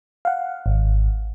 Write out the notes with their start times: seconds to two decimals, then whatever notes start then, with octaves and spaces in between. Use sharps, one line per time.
0.25 F5 F#5
0.66 G#1